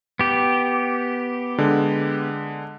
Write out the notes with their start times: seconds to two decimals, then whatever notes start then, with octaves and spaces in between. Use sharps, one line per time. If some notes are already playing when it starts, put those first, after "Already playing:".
0.19 B3 G4
1.58 D3 G#3